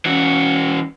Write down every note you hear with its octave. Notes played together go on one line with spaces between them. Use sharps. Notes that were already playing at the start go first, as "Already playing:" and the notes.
E3 C#4 F#4